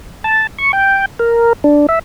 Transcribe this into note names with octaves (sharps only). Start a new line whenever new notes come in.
A5
C#6
G5
A#4
D4
E5